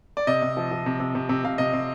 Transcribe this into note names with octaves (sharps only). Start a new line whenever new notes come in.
D5
C3 D#5
C3
F3
F3
C3
C3
C3
C3
C3 F5
C3 D#5
C3